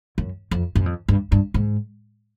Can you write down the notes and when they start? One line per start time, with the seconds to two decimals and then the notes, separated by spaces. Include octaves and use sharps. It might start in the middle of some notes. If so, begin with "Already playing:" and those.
0.18 F#2
0.51 F2
0.75 F#2
0.86 F2
1.09 G2
1.32 G2
1.54 G#2